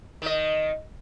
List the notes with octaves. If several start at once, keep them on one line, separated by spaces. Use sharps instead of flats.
D#3 D#5